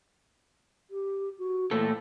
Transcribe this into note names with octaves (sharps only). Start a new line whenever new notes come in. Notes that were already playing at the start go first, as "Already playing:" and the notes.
G4
F#4
A#2 E3 A3 A4